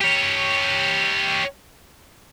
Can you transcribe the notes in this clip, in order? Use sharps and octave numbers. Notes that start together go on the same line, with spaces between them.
G4 C#5